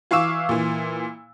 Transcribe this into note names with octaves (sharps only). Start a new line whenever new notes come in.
E3 F5 C#6 D6 E6 E7
A#2 E3